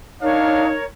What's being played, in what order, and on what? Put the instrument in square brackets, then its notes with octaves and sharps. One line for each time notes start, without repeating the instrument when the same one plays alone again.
[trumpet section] D4 F5 [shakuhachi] D#4 [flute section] A#4 C#5